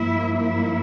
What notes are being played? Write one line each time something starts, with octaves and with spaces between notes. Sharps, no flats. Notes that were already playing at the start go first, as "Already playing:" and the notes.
Already playing: G2 F3 A#3 E4 E5
E4 E5